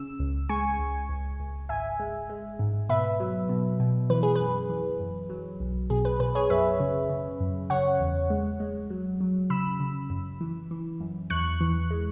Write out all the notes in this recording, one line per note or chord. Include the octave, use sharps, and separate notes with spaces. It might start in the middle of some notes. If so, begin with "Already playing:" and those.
Already playing: C#3 E6
C#2
G#3 G#5 C#6
C#2
C#2
C#2
G#1 E5 G#5
G#3
G#3
G#2
B2 B4 E5
F#3
B2
B2
E3 B4
G#4
F#2 B4
E3
F#2
F#3
B1
B2 G#4
B4
B2 B4
G#4 C#5
F#2 B4 E5
C#3
C#3
F#2
C#3 C#5 F#5
E2
G#3
G#3
F#3
F#3
C#3 B5 E6
C#3
F#2
E3
E3
F#2
E2 C#6 F#6
E3
G#3